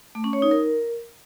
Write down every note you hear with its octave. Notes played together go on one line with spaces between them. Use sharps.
A3
C#4
C#5
D#4
A#4